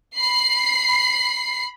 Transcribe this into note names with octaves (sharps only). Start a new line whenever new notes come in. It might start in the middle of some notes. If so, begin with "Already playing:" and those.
B5 C7